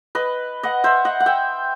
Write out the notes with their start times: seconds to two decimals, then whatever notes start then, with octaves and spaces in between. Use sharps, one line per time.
0.15 B4 D#5
0.63 D#5 F#5
0.84 C5 E5
1.05 D#5 F#5
1.20 F#5
1.26 E5 G5